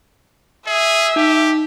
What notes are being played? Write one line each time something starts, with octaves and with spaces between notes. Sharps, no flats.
G#4 E5
D#4 G4